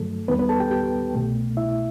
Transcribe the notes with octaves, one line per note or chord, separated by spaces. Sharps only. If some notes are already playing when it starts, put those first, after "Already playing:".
Already playing: G2 D#3 F#3 A3 A4
D#2 D#3 G3 B3 B4
B3 B4
A4 A5
G4 G5
G4 G5
C2 B2 A3
E4 E5